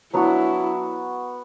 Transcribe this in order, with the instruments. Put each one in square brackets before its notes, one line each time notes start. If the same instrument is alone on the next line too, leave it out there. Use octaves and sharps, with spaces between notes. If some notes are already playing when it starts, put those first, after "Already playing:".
[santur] F#3 B3 D4 F#4 [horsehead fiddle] E4